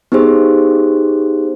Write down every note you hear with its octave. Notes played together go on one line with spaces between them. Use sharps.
B3 D#4 G4 G#4 C5